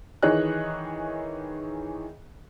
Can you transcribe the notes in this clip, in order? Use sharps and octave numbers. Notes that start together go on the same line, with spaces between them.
D#3 E3 G#4 C#5 D#5 F#6